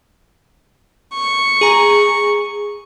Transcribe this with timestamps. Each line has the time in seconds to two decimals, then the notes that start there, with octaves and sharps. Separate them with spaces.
1.14 C#6
1.61 G#4 A#5